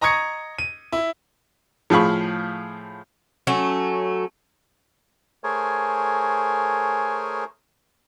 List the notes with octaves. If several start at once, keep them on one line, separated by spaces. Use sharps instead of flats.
D#5 A#5 C#6 D#6 G#6 C#7
D#7
E4
A2 F3 G#4 F5 B5 C#6
F#3 A3 C#4
A3 G#4 A#4 C5 C#5 G#5